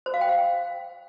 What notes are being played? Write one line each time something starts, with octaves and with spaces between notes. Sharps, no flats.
C5
F5
G5
F5